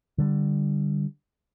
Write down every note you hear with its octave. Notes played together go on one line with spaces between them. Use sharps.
D3 G3